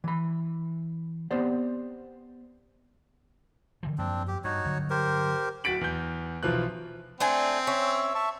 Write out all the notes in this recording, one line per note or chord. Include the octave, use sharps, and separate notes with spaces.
E3 B5
B3 C4 G4 C5 D5
D3 E3 F3
F#2 F3 A#3 C4 D4
G4
G2 D#4 F#4 C#5
G2 D3 F#3
G4 A#4 C5
D1 F#4 A6 B6 D7 F#7
E2 G6
B1 E3 F3 F4 F#6
A3 C4 D4 G#5
C#4 C#5 E5 E6
E5 A5 C#6